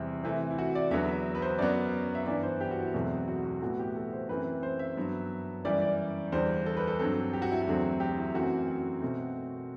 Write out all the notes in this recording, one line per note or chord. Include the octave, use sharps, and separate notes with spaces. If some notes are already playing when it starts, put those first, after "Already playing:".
Already playing: E2 C3 E3 G3 C4
C3 E3 A3
E4
F#4
D5
E2 D3 F#3 B3 E5
B4
C5
F#2 F#3 B3 D5
E5
G2 E3 B3 D5
C5
G4
F#4
E4
E2 B2 F#3 A3 C4
F#4
F#4
A2 E3 B3 F#4
G4
A4
C5
F#2 E3 A3 C4 B4
C5
E5
G2 F#3 B3
F#2 E3 G3 D5
D5
E2 D3 G3 C5
A4
B4
A4
G2 F#3 C4 A4
G4
F#4
E4
F#4
E2 D3 F#3 A3 C4
G4
E4
F#2 E3 A3 C4 F#4
F#4
B2 A3 C4